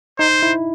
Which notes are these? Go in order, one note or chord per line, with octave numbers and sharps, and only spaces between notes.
D#4 C5
E4